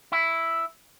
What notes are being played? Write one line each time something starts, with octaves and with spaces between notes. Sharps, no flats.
E4